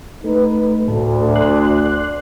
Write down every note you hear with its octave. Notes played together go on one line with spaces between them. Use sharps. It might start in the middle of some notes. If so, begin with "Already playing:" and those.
A3 D#4 B4
D2 A2 A4
D5 C6 F#6